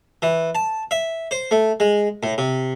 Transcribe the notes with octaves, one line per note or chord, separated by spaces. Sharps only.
E3
A5
E5
C5
A3
G#3
A2
C3